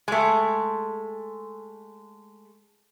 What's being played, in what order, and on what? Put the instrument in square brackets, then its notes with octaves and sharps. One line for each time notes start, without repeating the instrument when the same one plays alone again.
[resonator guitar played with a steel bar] G#3 A3